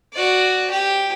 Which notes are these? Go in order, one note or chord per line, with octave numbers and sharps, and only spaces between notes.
F#4 D5
G4